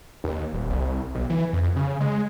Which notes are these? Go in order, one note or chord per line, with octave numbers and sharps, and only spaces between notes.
D#2
D#1
C2
B1
E3
F2
C#3
G#3